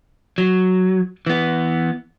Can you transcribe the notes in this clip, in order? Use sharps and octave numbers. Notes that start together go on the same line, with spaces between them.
F#3
E3 B3